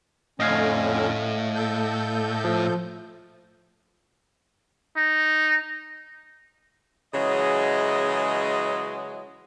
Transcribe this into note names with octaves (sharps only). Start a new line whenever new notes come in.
F2 A2 D3 C#4 D#5 F5 G#6
A4 G6
F3
D#4
C#3 E3 F#3 G#3 D#5